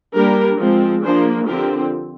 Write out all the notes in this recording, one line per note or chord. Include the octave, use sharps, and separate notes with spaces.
G3 A#3 D4 G4 A#4
F3 G#3 C4
F3 A#3 D4 G#4 C5
D3 F3 C4 G4 A#4